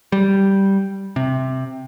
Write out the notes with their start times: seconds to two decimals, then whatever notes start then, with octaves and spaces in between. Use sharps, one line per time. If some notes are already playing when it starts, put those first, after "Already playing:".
0.12 G3
1.16 C3